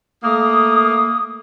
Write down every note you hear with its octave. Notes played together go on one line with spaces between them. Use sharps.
A3 A#3 D#6